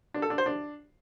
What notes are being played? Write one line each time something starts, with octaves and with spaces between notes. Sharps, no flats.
D4
A4
D4
C5
D4